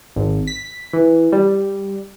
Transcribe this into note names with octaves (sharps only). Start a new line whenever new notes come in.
G#1
B6
E3
G3